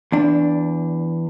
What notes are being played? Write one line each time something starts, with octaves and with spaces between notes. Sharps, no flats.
E2 D4